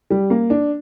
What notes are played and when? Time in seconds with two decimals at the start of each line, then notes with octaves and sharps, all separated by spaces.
0.10 G3
0.30 A#3
0.50 D4